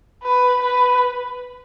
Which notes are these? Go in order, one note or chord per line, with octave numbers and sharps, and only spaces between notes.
B4
B4